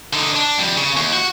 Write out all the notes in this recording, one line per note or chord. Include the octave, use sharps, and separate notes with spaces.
D3 D#4
D4
F2 G3
C#3
D#2
F#4